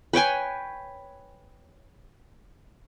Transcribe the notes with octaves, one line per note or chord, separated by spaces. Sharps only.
B4 C#5 G5 G#5